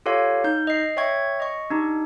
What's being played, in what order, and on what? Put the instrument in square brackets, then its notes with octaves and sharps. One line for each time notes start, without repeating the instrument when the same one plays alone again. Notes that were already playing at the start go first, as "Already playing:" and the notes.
[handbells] F4 G4 A4 C#5 F5
D#4 G6
D#5 C7
C#5 E5 G5 C#6 G#6
D#5 C#6
D4 D#4 G4